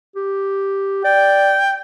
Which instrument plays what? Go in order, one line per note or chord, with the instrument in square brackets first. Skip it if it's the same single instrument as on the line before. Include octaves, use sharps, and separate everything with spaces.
[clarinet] G4
[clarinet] D5 [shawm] G5